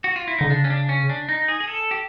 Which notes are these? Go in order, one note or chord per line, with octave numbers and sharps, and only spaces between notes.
F#4
F4
E4
D3 D#4
C#3 D4
C#4
D4
C#4
D4
D#4
G#4
G#4
A4
G4